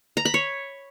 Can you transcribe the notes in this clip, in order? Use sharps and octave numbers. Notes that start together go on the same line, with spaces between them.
A#5
B5
C#5